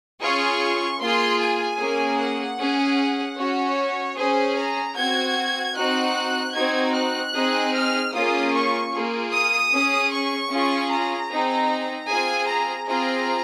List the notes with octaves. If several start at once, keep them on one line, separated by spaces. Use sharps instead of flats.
C#4 F4 G#4 C#6
A#3 F4 G#4 C6
G#5
A#3 C#4 G#4
F#5
C#4 G#4
C#4 F#4 C#5
C#4 G#4 C5
A#5
C4 F#4 G#6
C4 D#4 F#4 F#6
C4 D#4 F#4 G#6
F#6
C4 D#4 G#4
F6
A#3 C#4 F4 G#4 D#6
C#6
A#3 F4 G#4
D#6
C#4 G#4
C#6
C#4 F4 G#4
A#5
C4 D#4 G#4
C4 F4 G#4 G#5
A#5
C4 F4 G#4 A#5